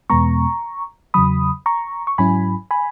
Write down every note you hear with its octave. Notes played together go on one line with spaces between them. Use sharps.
E2 B2 G#3 B3 A#5 C#6
E2 C#3 F#3 B5 D#6
A#5 C#6
C#6
G#2 F#3 C#4 E4 G#5 B5
G#5 B5